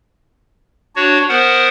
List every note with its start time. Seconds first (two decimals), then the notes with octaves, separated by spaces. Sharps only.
0.96 D4 F#4 C#5
1.29 B3 A#4 C5 F#5